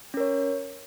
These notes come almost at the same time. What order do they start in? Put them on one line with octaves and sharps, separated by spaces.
C#4 A#4 C#5